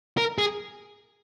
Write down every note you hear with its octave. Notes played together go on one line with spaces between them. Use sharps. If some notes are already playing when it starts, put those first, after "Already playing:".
A#4
G#4